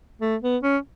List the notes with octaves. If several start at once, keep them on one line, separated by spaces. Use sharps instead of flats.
A3
B3
C#4